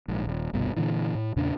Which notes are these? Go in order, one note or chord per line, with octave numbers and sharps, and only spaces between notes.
A#1 G#2
D#1
G1 C2 G2 B2
A#2 D3 E3
A2
E2 A#2 C#3 D4